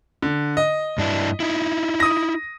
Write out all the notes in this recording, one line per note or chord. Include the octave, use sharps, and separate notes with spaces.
D3
D#5
G2 D4 E4
D#4 E4
D#6 A#6